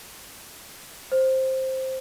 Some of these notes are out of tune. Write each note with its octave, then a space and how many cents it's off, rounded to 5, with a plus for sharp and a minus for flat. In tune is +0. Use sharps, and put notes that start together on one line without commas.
C5 +5